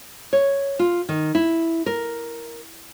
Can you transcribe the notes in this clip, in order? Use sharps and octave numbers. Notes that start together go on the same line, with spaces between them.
C#5
F4
D#3
E4
A#4